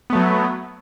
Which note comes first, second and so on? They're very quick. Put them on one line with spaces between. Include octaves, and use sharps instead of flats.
B3 A3 F#3